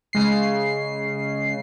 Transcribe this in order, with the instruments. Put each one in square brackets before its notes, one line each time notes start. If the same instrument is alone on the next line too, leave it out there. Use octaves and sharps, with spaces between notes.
[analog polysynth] C#3 G#3 C7